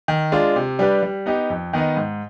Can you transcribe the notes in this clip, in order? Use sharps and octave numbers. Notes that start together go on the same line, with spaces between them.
D#3
G#3 D4 F4
C3
G3 D4 G4 B4
G3
B3 D#4 G4
F2
D#3 B3 D#4
G#2